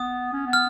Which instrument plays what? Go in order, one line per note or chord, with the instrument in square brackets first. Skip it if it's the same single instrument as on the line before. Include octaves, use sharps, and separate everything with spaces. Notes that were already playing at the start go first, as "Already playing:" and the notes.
Already playing: [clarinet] B3 [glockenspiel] D#6
[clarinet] C#4
B3
[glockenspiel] F6